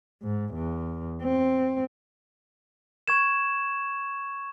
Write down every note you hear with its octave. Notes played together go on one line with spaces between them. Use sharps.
G#2
E2
C4
C#6 G#6 E7